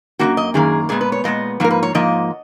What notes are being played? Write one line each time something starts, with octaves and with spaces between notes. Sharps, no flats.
F#2 D#3 A#3 F#4
D#5
F#2 D#3 A#3 G#4
A#2 G#3 B3 G#4
B4
C#5
A#2 G#3 B3 D#5
G#2 F3 A#3 A#4
B4
C#5
G#2 F3 A#3 D#5